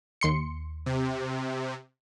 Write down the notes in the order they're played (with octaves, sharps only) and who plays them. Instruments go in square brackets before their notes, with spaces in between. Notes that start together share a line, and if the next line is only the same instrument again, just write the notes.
[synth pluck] D#2 C6 C#7
[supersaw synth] C3